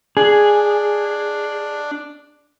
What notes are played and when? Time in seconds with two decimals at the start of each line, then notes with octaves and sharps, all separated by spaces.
0.17 D4 G#4